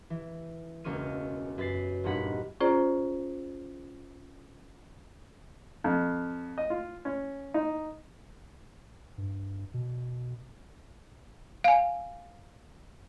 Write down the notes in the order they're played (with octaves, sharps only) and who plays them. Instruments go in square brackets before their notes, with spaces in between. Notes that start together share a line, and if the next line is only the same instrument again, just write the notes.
[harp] E3
E1 C#2 A#3 C#6 F6 D#7
F#2 B4 A6 C7
E1 G2 A#2 D#4 F#5 B5
[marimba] C#4 F4 G#4 C5 D5 A#5
[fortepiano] F2
D#5
F4
C#4
D#4
[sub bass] G2
B2
[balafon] F5 G#5